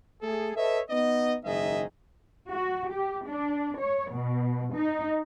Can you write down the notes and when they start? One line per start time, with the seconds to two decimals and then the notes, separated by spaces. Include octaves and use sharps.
0.22 A3 G#4 A4
0.56 A4 B4 C#5 D#5 E5
0.90 B3 D#4 D#5
1.44 F#1 G#2 D#3 G#4 D#5 E5
2.50 F#4
2.91 G4
3.27 D4
3.78 C#5
4.11 B2
4.76 D#4